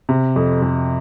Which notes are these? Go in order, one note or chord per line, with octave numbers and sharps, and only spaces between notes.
C3
F2
F2